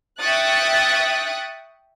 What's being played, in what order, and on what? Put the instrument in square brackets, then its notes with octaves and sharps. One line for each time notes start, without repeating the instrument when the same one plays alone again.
[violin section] E5 G5 C#6 D#6 F#6 A6